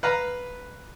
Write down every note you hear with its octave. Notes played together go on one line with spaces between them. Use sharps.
B4 F5 A#5